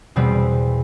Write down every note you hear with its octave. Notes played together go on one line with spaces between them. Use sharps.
E2 B2 G3 B3 C4